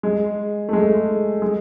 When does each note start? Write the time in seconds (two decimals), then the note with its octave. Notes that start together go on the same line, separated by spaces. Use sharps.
0.03 G#3
0.69 A3
0.73 G#3
1.42 G#3